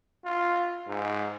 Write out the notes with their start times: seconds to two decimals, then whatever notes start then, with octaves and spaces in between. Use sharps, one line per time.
0.24 F4
0.88 G#2